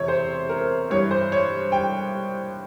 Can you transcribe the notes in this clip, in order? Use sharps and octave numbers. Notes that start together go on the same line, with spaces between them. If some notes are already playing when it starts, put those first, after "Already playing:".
Already playing: E2 C3 C#5
C5
A#4
G2 E3 C#5
C5
C#5
G5